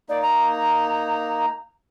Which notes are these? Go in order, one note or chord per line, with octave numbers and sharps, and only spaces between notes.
A#3 D#4 D5
A#5